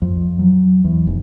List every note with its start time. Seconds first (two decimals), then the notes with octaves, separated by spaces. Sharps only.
0.02 F2
0.39 F#3
0.84 E2
1.07 F1